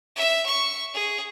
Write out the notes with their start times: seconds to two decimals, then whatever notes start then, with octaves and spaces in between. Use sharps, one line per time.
0.16 E5
0.46 C#6
0.94 G#4